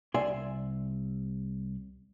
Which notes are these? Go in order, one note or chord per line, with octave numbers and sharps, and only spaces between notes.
C2 D5 E5 G#5 C6